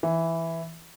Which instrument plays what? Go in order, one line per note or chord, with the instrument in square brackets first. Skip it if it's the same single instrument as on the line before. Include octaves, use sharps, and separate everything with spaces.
[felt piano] E3